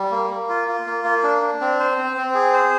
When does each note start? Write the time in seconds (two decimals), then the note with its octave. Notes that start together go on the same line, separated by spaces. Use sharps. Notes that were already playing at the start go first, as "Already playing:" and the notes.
Already playing: G3
0.12 A#3
0.30 A#3
0.49 F4
0.68 F4
0.86 A#3
1.04 A#3
1.23 D4
1.42 D4
1.61 C4
1.80 C5
1.98 C4
2.17 C4
2.35 G#4
2.53 C5